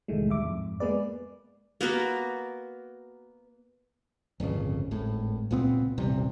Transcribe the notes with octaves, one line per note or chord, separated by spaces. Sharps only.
C2 A2 D#3 E3 G#3 A3
D#2 G3 E5 D6
F2 G#2
G#3 A#3 B3 G#4 B4 D5
A#3 B3 F#4 A#4
D1 G1 F2 C#3
G#1 A2
C#2 A#2 B3 C4
D#1 A1 C3 G3